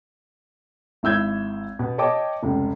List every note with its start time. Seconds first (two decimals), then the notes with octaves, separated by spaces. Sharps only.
1.03 G#1 E4 E6 G6 G#6
1.79 B2
1.98 C#5 D#5 G5 A5 D6
2.43 F1 C#2